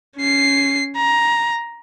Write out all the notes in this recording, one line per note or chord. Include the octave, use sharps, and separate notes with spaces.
C#4 C7
A#5